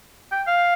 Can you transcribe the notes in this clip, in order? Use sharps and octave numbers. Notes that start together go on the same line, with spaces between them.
G5
F5